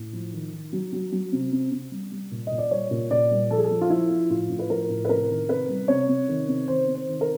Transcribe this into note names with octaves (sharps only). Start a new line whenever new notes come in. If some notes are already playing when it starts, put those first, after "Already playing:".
Already playing: A2
F3
D#3
D#3
F#3
F#3
F#3
C3
C3
C3
G3
G3
A#2
A#2 D#5
D5
G3 C#5
A#2
A#2 D5
G3
F3 A4
G#4
A4
F3
F4
F3 E4
F3
A2 F4
A2
B4
F3 A#4
A2
B4
C3 A#4
D#3
C3 B4
G3
C3 C#5
C3
D#3
C3
D#3 C5
C3
C5
D#3
A#4